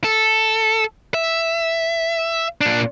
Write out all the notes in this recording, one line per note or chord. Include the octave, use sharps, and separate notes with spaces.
A4
E5
A#2 D4